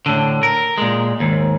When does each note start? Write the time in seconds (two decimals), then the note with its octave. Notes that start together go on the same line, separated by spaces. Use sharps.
0.06 A2 D3
0.43 A#4
0.78 A#2 G#3
1.20 D#2 G#2